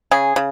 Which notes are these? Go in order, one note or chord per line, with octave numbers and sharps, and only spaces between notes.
C#3 G#4
C#3